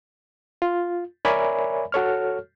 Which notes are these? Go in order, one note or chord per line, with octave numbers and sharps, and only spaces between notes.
F4
A#4 C#5 D5 E5 G#5 B5
F#4 A4 C#5 F6